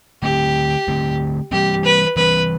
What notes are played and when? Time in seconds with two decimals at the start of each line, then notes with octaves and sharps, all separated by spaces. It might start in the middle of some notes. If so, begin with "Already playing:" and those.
0.23 D3 A3 C4 G4
0.88 D3 A3 C4
1.52 E3 G3 C4 G4
1.84 B4
2.16 E3 G3 C4 B4